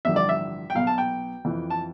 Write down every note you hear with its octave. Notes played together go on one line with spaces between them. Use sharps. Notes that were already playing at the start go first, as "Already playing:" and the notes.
A1 G2 D3 F3 E5
D5
E5
G5
B1 B2 F5
A5
G5
F2 E3
A5